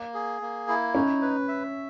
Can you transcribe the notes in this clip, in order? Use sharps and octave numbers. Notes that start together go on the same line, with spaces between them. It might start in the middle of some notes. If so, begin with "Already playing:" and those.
Already playing: A#3
G#4
A#3
E4
C#4 D#4
B4
E5